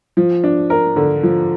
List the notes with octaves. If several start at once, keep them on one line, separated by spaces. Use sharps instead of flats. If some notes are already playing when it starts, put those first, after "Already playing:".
F3
D4
A#4
D3
F3